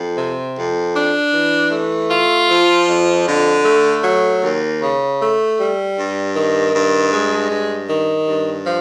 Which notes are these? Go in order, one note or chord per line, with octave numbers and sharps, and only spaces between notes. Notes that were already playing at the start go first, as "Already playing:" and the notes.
Already playing: F2
C3
F2
D4
E3
A3
F4
F3
F2
D3
A3
F#3
D#2
C#3
A3
G3
G2
D#3
G2
G#3
G2
D#3
G2
F3